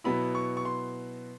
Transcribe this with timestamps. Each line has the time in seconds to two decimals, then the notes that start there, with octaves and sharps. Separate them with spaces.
0.04 B2 F#3 B3 E4 B5
0.35 C#6
0.57 C#6
0.65 C6